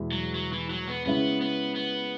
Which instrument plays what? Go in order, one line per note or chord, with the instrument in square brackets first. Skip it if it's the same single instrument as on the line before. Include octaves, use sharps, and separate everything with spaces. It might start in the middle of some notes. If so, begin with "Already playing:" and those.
Already playing: [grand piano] E2 B2 G#3 E4
[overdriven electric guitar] F#3
F#3
E3
F#3
B3
[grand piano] C#3 G#3 C#4 E4 [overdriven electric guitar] B3
[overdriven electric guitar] B3
B3